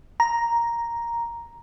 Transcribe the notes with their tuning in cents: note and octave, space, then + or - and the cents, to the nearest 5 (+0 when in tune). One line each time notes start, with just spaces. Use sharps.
A#5 +5